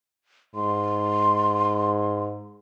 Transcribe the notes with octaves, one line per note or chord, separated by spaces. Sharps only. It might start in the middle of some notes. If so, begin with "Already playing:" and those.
G#2 C6